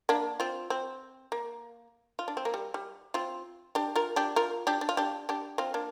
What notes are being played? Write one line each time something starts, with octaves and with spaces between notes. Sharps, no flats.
A#3 D4
C4 F4
C4
A#3
F4
D4
C4
A#3
G3
G3
C4 F4
D4 G4
F4 A#4
D4 G4
F4 A#4
D4 G4
D4
F4
D4 G4
D4 G4
C4 F4
A#3 D4